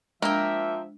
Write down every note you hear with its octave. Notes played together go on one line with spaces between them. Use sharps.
F3 G#3 A#3 D4 A#4 E5 G5